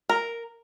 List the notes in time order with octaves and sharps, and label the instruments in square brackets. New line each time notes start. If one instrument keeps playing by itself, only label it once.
[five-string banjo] A#4